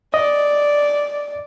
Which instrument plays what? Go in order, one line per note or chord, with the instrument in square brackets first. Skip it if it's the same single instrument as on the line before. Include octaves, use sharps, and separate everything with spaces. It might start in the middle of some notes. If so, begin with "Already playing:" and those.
[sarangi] D5 [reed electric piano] D#5